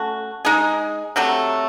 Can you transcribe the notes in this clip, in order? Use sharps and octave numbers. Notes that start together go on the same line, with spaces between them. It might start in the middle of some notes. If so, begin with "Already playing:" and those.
Already playing: A3 C#4 F#4
G#3 D#4 G#4
C3 F#3 A3